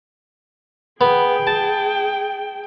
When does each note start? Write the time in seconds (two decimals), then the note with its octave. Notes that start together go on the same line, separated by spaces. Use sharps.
1.01 B3 G#4 G5
1.47 A5